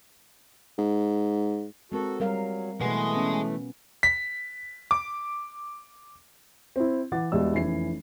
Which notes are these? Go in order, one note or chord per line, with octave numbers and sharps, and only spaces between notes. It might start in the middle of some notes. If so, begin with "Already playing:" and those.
G#2
G#3 C4 F#4 A4 A#4
F#3 G3 A#4 F5
B2 E3 G#3 A3 B4 F#5
B3 C#4
B6
D6
C4 E4
E3 F#5 D6 A6
E1 E2 G3 G#3 D5 E6
F1 E3 C#4 E4 C7